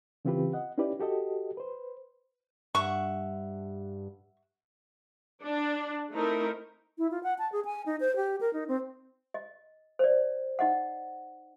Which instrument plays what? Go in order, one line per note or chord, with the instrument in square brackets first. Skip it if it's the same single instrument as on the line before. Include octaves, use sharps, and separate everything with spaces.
[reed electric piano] C#3 E3 C4 F4 G4 B4
D#5 F#5
C#4 D#4 E4 G4 B4 D5
F#4 G4 A4 D#5
B4 C5
[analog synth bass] G2 [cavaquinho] E5 F#5 [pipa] C#6
[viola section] D4
A3 C4 D#4 E4 A#4
[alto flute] E4
F4
F#5
A5
G#4
G#5
D#4
C5
G4
A#4
D#4
C4
[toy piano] D#5
C5 D5
D#4 D#5 F#5